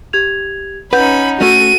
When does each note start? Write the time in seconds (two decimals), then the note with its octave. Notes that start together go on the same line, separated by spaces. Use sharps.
0.13 G4 G#6 F7
0.93 C#4 D#4 B4 F#5 B5 G6
1.41 A3 C#4 F#4 A4 D#7